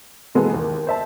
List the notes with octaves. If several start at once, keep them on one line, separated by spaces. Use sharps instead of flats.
B2 E3 G#3 A#3 B3 A4
D#2
C5 E5 A5